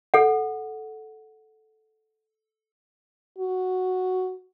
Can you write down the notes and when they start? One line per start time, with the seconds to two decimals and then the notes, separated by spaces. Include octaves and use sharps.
0.14 A4 F#5
3.38 F#4